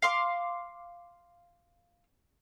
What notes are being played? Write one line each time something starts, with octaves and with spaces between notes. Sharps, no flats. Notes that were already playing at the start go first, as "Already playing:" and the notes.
F5 C6 D6